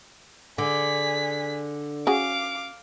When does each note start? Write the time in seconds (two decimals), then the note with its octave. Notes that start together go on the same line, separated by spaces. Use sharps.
0.58 D3 G#4 B6
2.07 C#4 F#4 G#4 F5 D6